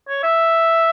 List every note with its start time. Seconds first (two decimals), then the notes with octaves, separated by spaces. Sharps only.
0.09 C#5
0.23 E5